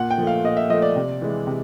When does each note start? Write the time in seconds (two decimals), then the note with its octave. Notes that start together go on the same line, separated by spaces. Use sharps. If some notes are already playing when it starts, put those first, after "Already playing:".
Already playing: A#2 F#5
0.11 G5
0.18 F3 A3
0.27 F5
0.44 A#2 D#5
0.57 E5
0.70 F3 A3 D#5
0.82 D5
0.96 C3
1.22 E3 G#3
1.47 C3